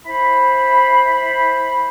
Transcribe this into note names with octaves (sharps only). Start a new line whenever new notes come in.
E4 C5 B5